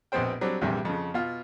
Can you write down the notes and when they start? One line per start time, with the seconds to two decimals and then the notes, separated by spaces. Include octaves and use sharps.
0.12 A#1 B2 B3 C4 C5 G5
0.41 F#3 G3 C4 D4
0.61 A#1 E2 G2 C3 G3
0.85 F2 C#3
1.14 B2 F4